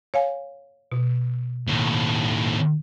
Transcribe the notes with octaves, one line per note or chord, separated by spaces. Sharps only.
C#5 F5 G#5
B2
D#2 A2